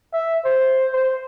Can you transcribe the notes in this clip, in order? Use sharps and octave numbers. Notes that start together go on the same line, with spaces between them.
E5
C5
C5